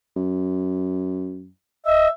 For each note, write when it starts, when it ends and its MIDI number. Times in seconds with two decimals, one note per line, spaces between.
0.16 1.49 42
1.86 2.08 75
1.86 2.09 76